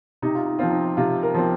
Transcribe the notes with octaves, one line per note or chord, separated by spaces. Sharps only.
C3 D#4
F4
D#4
F3 C4 F4
D#4
C3 F4
A#4
F3 C4